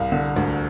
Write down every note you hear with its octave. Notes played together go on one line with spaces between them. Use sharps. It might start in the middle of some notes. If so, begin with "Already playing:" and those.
Already playing: C2 F5
D3
D2